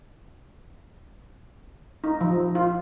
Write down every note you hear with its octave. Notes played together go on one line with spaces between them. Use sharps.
D#4
F3
F4